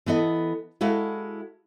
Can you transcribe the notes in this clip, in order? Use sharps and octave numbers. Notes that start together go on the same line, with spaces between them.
E3 B3 A4 D#5
G#3 E4 F#4 A4 F5